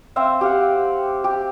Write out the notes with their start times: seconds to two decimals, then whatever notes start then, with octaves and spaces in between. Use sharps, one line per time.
0.16 C4 C5 E5 F5
0.41 G4 F5 F#5
1.24 G4